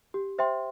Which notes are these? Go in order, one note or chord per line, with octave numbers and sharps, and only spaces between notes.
G4
C5 E5 G5 C6